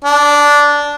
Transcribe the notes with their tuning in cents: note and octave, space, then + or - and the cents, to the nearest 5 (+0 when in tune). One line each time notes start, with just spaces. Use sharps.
D4 -10